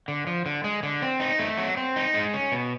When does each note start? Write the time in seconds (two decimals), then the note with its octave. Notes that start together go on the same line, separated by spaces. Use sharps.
0.08 D3
0.27 F3
0.46 D3
0.64 G#3
0.83 D3
1.02 C4
1.20 D#4
1.39 A3
1.58 F#3
1.77 C4
1.96 D#4
2.14 G#3
2.34 C#4
2.52 B2